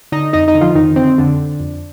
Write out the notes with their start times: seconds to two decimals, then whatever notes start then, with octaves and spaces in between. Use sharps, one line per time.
0.12 D3 D#4 D#5
0.33 F2 D#4 D#5
0.48 D#4 D#5
0.55 D3
0.61 F3 F4
0.75 F2 D#3 D#4
0.96 D3 C4
1.18 F2 D3 D4
1.39 D3
1.60 F2